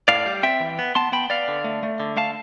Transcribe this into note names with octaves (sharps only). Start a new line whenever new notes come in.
A2 D5 F5
G3
C4 E5 G5
E3
B3
B3 A5 C6
B3 G5 B5
B3 D5 F5
D3
A3
A3
D3
A3 F5 A5